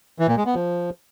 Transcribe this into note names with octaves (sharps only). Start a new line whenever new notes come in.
E3
A#2
G#3
B3
F3